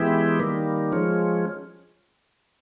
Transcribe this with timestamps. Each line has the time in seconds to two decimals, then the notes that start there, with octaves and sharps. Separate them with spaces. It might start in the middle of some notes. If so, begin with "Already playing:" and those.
Already playing: E3 G#3 B3 E4 G4
0.40 D#3 G3 A#3
0.92 F3 G#3 C#4